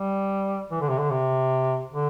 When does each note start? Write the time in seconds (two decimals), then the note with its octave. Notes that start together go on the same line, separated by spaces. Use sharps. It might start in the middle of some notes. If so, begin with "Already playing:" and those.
Already playing: G3
0.71 E3
0.81 D3
0.89 C3
0.98 D3
1.11 C3
1.92 D3